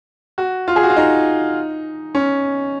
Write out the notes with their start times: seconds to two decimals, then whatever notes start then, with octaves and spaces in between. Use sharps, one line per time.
0.38 F#4
0.68 F4
0.76 G#4
0.83 F#4
0.90 F4
0.96 D#4
2.15 C#4